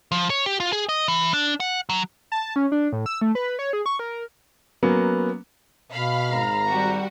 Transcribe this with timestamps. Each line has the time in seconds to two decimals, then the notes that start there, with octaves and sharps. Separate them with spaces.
0.12 F3
0.30 C#5
0.46 G4
0.60 F4
0.73 G#4
0.89 D#5
1.08 E3
1.33 D4
1.60 F#5
1.89 F#3
2.32 A5
2.56 C#4
2.72 D4
2.93 A2
3.06 E6
3.21 A3
3.35 B4
3.59 C#5
3.73 G#4
3.86 C#6
3.99 A#4
4.83 F#3 A#3 B3 C#4
5.91 B2 F5 B5 F6
6.29 G#1 A#5
6.68 G3 F#4 G4